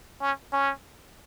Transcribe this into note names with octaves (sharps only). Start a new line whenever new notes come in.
C#4
C#4